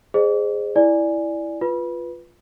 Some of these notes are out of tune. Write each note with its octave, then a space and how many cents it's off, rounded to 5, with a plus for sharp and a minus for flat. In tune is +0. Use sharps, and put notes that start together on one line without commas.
G#4 +0 C5 +0 D#5 -40
E4 +0 D5 +0 G#5 +0
F4 +0 B4 -5